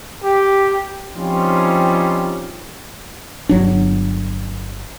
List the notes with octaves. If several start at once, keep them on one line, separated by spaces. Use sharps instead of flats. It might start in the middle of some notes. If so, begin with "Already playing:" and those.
G4
F3 G3 C4 C#4 D#4 F4
G1 F#3 D4